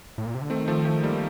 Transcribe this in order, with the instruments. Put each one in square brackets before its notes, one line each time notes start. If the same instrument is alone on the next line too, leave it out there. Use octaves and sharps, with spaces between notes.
[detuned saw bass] A2
A#2
C3
D3
[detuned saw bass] D#3 [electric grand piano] A3 C4
[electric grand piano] F3 A3
F3 A3
G3 A#3